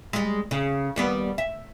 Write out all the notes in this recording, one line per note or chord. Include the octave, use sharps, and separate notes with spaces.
G3 G#3
C#3
D#2 G3 B3
E5